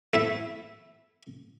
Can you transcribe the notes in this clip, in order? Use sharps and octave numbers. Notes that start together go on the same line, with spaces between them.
A3 E4 E5